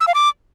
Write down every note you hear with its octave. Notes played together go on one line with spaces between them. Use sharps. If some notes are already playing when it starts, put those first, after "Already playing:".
E6
F5
D6